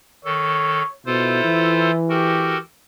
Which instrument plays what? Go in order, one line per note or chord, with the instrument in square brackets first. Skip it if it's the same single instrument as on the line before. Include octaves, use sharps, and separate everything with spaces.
[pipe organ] D#3 A4 [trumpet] C#5
[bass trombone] B2 [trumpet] E4 [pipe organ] F4 A4 C5
[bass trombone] E3
[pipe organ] F#4 A4 A#4 [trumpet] G4